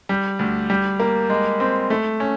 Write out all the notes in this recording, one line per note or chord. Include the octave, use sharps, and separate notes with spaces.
G3
D2
G3
A#3
G#3
C4
A3
C#4